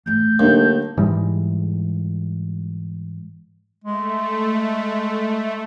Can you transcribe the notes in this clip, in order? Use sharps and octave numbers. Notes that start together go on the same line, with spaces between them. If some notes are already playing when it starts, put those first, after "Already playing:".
E2 A2 G6
D#2 D3 F#3 A3 D#4
G#2 E3 G3 G#3
G#3 A3